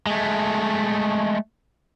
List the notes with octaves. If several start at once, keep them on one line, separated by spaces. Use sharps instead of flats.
G#3 A3